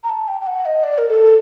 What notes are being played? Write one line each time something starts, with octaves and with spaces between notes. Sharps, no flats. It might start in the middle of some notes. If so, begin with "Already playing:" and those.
A#5
A5
G5
G5
F#5
D#5
D5
A#4
A4